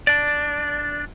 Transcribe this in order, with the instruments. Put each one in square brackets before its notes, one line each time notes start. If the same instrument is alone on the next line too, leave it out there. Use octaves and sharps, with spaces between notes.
[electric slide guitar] D4 D5